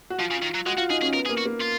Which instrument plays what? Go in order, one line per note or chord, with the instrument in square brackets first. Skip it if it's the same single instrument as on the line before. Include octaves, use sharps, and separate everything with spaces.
[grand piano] F#4
[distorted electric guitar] F3 [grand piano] F4
[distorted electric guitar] C#3
D#3
F#3
[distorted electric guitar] G#3 [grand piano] F#4
[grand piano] F4 [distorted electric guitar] F#4
[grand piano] D#4 [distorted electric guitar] G#4
[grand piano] C#4 [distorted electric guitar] G#4
[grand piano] B3 [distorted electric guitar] A#4
[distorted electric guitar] G#4
[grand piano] A#3
[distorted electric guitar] F#4
[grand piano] A#3
[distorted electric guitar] F4